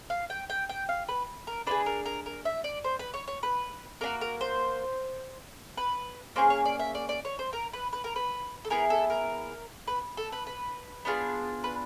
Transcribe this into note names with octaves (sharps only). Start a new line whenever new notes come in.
F5
G5
G5
G5
F5
B4
A#4
D4 F4 G#4 B4
A#4
A#4
A#4
E5
D5
C5
B4
C#5
C#5
B4
A#3 D4 F#4 A#4
A#4
C5
B4
A#3 C#4 G#4 C5
C#5
D5
E5
D5
D5
C#5
C5
A#4
B4
B4
A#4
B4
A4
B3 E4 G#4 A#4
A4
A#4
B4
A4
B4
B4
B3 D4 F4 G#4
B4